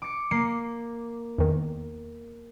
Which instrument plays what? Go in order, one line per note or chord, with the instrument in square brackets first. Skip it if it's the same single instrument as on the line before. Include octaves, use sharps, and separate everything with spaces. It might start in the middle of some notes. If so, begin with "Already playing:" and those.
[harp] D6 C#7
[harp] A#3 [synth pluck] C7
[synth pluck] E2 D#3